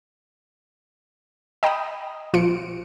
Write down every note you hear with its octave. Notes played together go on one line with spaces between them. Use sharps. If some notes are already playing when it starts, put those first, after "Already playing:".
D#5 G5 A#5 B5 D#6
A#1 F3 F4 C#7 D7